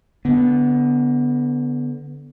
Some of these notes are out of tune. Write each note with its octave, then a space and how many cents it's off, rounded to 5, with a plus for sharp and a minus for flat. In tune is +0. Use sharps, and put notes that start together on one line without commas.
D3 -20 B3 +0